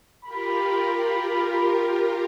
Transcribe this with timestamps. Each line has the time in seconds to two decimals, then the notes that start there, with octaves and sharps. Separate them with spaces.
0.24 F4 G4 A#4 B5